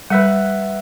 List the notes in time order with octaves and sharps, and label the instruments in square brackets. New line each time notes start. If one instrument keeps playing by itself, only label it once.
[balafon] G3 [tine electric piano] B4 E5 F#5